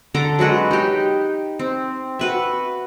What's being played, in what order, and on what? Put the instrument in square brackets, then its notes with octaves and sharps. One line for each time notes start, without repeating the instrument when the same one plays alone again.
[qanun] D3 A4 A#5 D6
F#3 G#3 F#4 B4
D#4 G4
C4
F#4 B4 E5